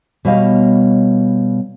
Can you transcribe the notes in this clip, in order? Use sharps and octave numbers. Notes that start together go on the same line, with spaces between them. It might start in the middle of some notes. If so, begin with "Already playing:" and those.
B2 G3 C#5 D#5 F5